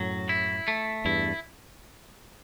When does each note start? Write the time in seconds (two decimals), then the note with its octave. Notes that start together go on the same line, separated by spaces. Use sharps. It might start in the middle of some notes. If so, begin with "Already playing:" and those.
Already playing: F#2 A2 F#3
0.29 E4
0.68 A3
1.05 E2 G2 E4